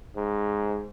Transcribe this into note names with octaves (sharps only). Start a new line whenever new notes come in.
G#2